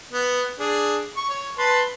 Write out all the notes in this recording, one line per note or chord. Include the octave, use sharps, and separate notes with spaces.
B3
D4 G#4
C#6
C#5
B4 A5 C6